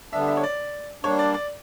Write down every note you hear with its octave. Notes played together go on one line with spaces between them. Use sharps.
D3 G3 B3 D4 E5
E5
C#5
D5
G3 A#3 D4 C#5
D5
D5